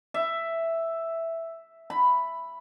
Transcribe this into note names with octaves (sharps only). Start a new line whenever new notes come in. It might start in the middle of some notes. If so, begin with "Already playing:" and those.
E5
B5